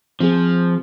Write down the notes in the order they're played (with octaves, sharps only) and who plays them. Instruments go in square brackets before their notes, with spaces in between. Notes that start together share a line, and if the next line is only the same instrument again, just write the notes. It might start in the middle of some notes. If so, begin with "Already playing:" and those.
[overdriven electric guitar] F3 [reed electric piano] C4 G#4